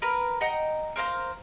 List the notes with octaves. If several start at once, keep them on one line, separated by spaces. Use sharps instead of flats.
A#4 B4 A#5 B5
D#5 F#5 G5 A#5
A#4 C5 F5 A#5